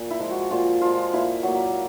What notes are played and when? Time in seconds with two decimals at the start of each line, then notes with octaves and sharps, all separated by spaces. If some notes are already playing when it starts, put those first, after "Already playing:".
Already playing: A#2
0.10 E4
0.20 F3 G#3
0.31 F#4
0.51 A#2 F4
0.81 F3 G#3 F4
1.13 A#2 E4
1.43 F#3 A#3